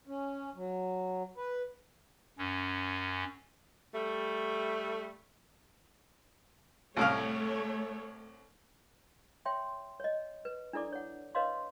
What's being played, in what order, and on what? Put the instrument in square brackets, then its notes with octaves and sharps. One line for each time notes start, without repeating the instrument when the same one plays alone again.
[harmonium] C#4
F#3
B4
[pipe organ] F#2 C#4
[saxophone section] G3 A3
[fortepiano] C2 A2 F5 [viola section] A3 C#5
[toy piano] C#5 E5 G5 C6
C#5 D#5
B4
D4 E4 A4 D5 D6
C#5 F#5
B4 C#5 D#5 F5 C6